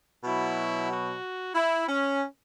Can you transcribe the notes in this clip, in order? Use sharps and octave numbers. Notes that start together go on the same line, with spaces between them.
B2 F#3 E4
F#4
E4
C#4